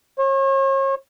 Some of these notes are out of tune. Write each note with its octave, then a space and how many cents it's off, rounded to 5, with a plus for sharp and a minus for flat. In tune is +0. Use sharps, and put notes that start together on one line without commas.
C#5 -40